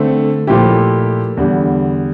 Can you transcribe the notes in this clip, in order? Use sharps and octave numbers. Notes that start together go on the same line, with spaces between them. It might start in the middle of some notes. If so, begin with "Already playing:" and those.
Already playing: D3 A3 C4
A#2 F3 A3 E4 G4
E2 D3 G3